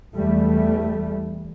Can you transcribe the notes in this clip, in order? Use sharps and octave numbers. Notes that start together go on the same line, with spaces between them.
E2 E3 G3 A3